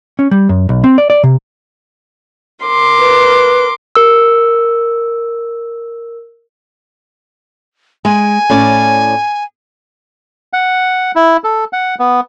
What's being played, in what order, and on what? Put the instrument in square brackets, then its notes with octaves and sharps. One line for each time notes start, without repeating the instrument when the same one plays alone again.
[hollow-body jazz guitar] C#4
G3
F#2
B1
C4
D5
D5
C3
[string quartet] A#4 C6 D6
[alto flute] B4
[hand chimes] A#4 E6
[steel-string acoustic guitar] G#3 [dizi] G#5
[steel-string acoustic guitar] A2 C#4 D5
[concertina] F#5
E4
A4
F#5
B3